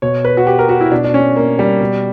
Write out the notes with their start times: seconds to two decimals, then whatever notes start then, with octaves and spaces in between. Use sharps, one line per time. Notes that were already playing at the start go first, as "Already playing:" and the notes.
0.02 B2 C#5
0.25 B4
0.37 F#4
0.47 G4
0.59 A#4
0.69 F#4
0.81 E4
0.92 B2 D4
1.04 D4
1.14 C#4
1.36 A#3
1.59 G3
1.81 B2